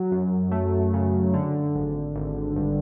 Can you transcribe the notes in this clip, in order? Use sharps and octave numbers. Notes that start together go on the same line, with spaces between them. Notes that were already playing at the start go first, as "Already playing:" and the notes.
Already playing: F#3
F#2
A3
C#3
D3
G#1
G#1
G2